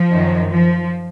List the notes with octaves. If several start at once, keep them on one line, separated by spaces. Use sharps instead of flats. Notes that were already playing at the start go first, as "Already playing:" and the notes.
Already playing: F3
F#2 D#3
F3